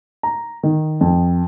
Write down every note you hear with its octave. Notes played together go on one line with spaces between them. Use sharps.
A#5
D#3
F2